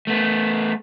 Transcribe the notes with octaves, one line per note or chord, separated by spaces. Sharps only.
A3 B3